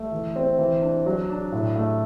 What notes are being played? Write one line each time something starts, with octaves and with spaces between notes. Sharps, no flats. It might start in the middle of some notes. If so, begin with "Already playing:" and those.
Already playing: A3
E3
C4
E3
D4
F#3
D4
A2
A3